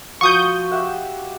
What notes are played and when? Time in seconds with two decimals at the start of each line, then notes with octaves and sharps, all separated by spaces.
0.21 F3 F#4 C#6 D#6 G6
0.71 G4 E5 F#5